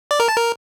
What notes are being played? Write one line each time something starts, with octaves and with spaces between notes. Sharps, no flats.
D5
A#4
A5
A#4